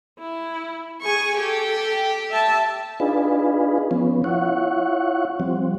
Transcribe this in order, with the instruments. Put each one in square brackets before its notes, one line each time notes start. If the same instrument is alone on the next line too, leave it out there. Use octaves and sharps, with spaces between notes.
[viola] E4
[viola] G#4 G#5 [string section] C#6
[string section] G4 [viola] A4
[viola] E5 A5
[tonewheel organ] D4 D#4 F4 G#4 B4
F3 B3 C#4
E4 F4 C#5 F#5
F3 G3 C4